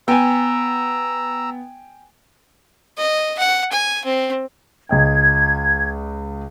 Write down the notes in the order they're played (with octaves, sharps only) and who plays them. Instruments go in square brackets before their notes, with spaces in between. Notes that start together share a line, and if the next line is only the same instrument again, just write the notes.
[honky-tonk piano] B3 [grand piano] G5 G#5 [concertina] A#5 E6
[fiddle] D#5
F#5
G#5
C4
[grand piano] C#2 D#5 G5 [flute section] G#6